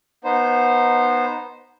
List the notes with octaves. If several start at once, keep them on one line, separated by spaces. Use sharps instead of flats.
B3 D#4 C5